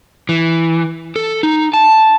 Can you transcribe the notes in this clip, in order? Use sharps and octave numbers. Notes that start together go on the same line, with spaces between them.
E3
A4
D#4
A5